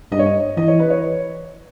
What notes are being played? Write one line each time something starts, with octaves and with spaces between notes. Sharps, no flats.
G2 D#5
C#5
D#5
E3 D#5
C#5
B4
C#5